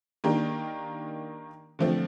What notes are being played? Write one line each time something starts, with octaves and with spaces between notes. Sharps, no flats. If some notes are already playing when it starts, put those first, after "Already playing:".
D#3 A#3 D4 G4 A#4
D3 F3 A3 C4